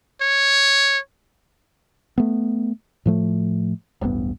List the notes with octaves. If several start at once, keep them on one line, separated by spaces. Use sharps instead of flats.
C#5
A3 B3
A2 F3 A3
D1 A1 G2 B3